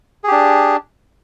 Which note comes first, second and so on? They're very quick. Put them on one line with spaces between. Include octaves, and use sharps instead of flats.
G#4 G4 D4